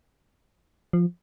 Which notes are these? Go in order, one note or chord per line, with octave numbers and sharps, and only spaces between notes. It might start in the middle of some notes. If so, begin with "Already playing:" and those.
F3